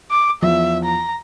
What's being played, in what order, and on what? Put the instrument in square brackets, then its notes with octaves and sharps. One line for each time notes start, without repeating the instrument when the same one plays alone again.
[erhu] D6
[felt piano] E2 E3 F3 [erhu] E5
[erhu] A#5